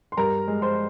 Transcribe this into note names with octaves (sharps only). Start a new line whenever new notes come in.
C6
G2 A#4 A#5
G#3
C5 C6